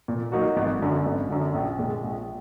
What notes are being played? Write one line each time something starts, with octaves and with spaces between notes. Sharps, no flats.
A#2
F#3 A#3 D#4 F#4
G#1
F#2 D3
G#1
F#2 D3
A#1
A#2 G#3
A#1